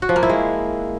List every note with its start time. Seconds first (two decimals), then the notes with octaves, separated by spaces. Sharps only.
0.02 F#4
0.09 F3
0.16 A#3
0.23 E4
0.29 G#3